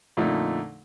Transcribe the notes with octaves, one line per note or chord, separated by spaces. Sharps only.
F2 A#2 D3 F3 A3 D#4